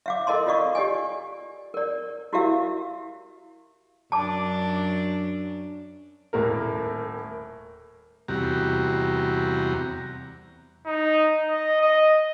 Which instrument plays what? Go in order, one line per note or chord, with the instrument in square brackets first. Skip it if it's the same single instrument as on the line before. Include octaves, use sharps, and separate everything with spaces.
[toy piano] E5 F5 D6
A4 A#4 D#5 A5 C6
F4 D5 D#5 F5 C#6
G4 D5 D#5 G#5
A#4 D5
E4 F#4 G4 A#4 E5 F5
[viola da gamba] F#2 D4 [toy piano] A5 D6
[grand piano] D#1 A2 A#3 A#4
[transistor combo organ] E2 C3 G3 F#4 A#5
[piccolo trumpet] D#4
D#5
D#5